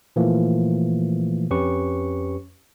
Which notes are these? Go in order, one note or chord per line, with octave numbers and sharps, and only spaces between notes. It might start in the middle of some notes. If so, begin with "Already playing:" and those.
A#2 E3 F3 A3 A#3
F2 C#4 G4 B4 C#6